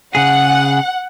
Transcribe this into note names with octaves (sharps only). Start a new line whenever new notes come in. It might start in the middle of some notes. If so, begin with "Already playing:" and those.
C#3 G#4 F#5